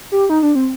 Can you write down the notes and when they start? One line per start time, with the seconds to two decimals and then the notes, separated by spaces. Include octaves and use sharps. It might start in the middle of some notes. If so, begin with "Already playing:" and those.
0.12 G4
0.29 D#4
0.43 D4
0.55 C4